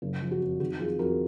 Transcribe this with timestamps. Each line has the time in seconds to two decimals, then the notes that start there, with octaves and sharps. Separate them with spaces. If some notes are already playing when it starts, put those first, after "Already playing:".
0.02 F#1
0.22 F3
0.31 F#4
0.41 F2
0.60 D#3 F#4
0.80 F2 F4 G#4
0.99 F2 F#4 A#4